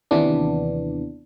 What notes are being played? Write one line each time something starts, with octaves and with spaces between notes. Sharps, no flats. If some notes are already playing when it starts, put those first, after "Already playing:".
D#2 C3 E3 B3 D4